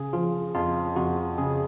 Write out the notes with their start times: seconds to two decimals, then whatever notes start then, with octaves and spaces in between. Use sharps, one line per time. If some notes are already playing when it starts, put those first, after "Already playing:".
Already playing: C#3 G#4
0.13 F3 F4
0.55 F2 F4
0.96 F2 F#4
1.38 C#3 G#4